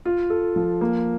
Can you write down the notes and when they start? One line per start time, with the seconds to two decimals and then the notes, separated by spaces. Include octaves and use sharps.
0.05 F4
0.30 A4
0.56 F3
0.81 A#3